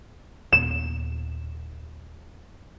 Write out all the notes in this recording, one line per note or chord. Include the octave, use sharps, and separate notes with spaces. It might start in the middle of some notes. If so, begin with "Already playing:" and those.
D#2 A#2 B3 E7